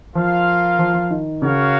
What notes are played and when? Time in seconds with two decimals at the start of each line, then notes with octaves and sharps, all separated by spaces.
0.15 F3 F4 A#4 F5
0.79 F3
0.94 F3
1.10 D#3
1.42 C#3 F#4 A#4 C#5 F5